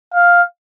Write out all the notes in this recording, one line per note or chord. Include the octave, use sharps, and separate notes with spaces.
F5